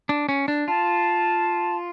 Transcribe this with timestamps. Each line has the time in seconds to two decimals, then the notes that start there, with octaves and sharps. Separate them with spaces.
0.09 D4
0.29 C#4
0.48 D4
0.67 F4 A5